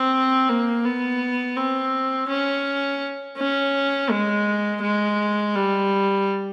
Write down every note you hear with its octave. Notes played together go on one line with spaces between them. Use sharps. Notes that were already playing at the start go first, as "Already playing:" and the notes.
Already playing: C4
A#3
B3
C4
C#4
C#4
G#3
G#3
G3